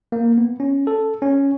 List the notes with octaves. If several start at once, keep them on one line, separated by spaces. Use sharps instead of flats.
A#3
B3
C#4
A4
C#4